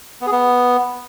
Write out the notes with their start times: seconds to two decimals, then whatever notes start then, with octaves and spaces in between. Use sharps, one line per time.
0.21 B3
0.27 G#4
0.32 B3